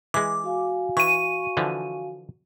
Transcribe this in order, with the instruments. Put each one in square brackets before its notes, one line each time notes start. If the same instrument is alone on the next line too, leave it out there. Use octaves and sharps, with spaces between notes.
[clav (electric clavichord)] E3 G#3 [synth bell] D6
[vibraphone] F#4 F5 G#5
[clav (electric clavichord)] E3 [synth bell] C#6 D#7
[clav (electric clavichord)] D3 E3 F3